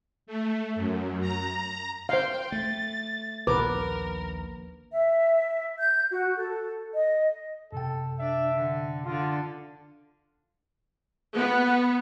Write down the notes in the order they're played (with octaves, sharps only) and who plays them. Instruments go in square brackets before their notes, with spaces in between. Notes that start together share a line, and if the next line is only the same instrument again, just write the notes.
[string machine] A3
F#2
A#5
[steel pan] C5 F5 [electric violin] G5 C6
[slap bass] A3 [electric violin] A6
[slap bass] A#1 D#2 [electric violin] A#4 [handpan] B4 [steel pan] D6
[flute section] E5
G6
F#4
A4
D#5
[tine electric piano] F#2 C3 G5 [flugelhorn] A4
[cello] D4 [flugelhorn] E5
[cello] D3
[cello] D3 [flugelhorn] F4
[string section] B3